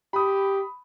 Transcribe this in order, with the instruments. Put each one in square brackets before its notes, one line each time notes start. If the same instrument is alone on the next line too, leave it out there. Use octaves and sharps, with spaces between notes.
[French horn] G4 [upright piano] B5 D#6